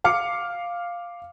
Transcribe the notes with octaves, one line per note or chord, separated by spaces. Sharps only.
F5 D6 F6 C#7